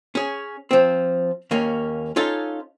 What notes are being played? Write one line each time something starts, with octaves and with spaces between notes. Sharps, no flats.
C#4 G#4
F3 C4
D#2 A#3 C#4
C#4 D#4 F4 A4